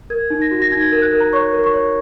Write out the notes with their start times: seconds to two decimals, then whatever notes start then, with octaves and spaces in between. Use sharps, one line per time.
0.10 A#4 G#6
0.30 D#4
0.42 A#6
0.51 F#4
0.62 A#6
0.72 D#4 G#6
0.92 A#4
1.02 F#6
1.12 A#4
1.20 A#5
1.33 C#5 C#6
1.53 A#4
1.64 C#6
1.74 C#5